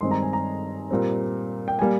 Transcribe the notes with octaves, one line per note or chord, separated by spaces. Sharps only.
G2 D#3 G#3 C4 C6
A#5
G#5
A#5
A#2 G3 C4
G5
G3 A#3 G#5